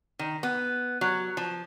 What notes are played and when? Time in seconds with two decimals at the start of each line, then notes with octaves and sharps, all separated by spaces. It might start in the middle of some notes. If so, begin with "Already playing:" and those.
0.19 D#3
0.43 B3
1.01 F#3
1.37 F3